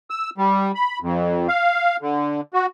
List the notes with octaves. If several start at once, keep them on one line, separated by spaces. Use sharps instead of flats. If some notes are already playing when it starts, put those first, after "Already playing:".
E6
G3
B5
F2
F5
D3
F#4